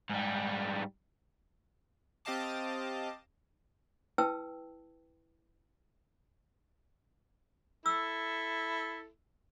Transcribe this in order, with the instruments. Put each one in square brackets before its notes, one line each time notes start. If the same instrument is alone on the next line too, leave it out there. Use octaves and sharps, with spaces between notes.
[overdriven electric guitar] G#2 G3
[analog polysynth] C4 G4 D#5 F5 A5 D6
[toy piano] E4 B4 G5 A5 E6
[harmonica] E4 A4 [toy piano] E6